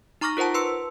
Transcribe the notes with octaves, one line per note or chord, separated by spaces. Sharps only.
D#4 A#5 C#6 D6 F6 A#6
F4 A#4 C5 F#5 A5
B4 C6 E6 C#7